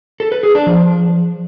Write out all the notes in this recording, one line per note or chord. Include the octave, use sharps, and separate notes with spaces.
A4
B4
G#4
D4
F3